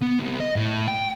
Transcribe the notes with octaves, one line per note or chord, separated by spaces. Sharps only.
B3
C2
D#5
A2
G5